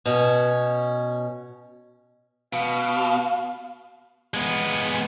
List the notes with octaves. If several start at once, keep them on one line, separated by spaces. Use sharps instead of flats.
B2 C#4
B2 F5
G#3 B3